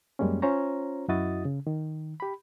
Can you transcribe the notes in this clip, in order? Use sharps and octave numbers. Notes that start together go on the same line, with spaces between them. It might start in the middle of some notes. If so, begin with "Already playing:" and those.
F#2 G3 G#3 A#3 C#4
C#4 F4 C5 C#5 A#5
F#2 E4 F#4 D#5 D#6 A6
C#3
D#3
G4 B5